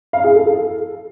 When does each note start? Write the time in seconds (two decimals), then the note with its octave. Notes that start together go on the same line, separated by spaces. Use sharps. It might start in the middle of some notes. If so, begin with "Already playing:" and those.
0.13 F5
0.24 G#4
0.35 A4
0.46 A4